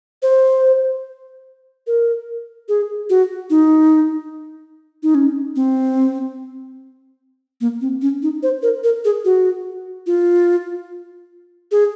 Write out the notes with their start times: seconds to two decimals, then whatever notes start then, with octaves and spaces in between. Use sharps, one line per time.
0.23 C5
1.87 A#4
2.69 G#4
3.10 F#4
3.50 D#4
5.03 D#4
5.15 C#4
5.56 C4
7.61 A#3
7.81 C4
8.02 C#4
8.22 D#4
8.43 C5
8.63 A#4
8.84 A#4
9.05 G#4
9.25 F#4
10.07 F4
11.72 G#4